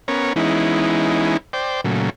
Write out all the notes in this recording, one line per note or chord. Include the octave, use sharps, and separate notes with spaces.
B3 C#4 A#4 C#5
E3 G#3 B3 C#4 D#4 E4
C5 D5 G5
A#2 C#3 F#3 A3